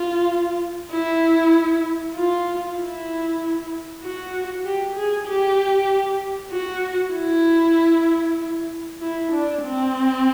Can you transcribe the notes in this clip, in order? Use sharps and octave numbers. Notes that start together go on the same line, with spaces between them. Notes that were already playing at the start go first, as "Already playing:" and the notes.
Already playing: F4
E4
F4
E4
F#4
G4
G#4
G4
F#4
E4
E4
D4
C4